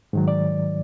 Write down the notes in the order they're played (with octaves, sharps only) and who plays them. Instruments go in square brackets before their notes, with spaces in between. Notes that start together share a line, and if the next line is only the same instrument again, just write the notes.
[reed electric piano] G#2 D#3 F#3
D5